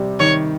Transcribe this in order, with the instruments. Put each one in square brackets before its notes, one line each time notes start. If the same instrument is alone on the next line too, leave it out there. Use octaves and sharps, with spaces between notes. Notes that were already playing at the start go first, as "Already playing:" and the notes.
Already playing: [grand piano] C3 G3
[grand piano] D#3 [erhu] C#5